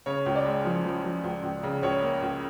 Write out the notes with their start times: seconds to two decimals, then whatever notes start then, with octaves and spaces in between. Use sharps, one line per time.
0.06 C#3 C#5
0.26 C#2
0.36 D5
0.45 G#3
0.65 F3
0.85 F3
1.04 F3
1.24 C#2
1.43 C#2
1.63 C#3
1.83 C#2 C#5
2.03 A#3
2.22 C#2